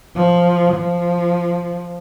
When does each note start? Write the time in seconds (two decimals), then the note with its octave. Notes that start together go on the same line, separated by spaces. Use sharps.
0.16 F3
0.74 F3